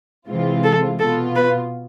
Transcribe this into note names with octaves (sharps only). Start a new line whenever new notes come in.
C3 E3 G#3 C4 F4
A4
B2 B3 F4 A4
B4